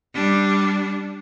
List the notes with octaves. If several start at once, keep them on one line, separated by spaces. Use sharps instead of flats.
G3 D4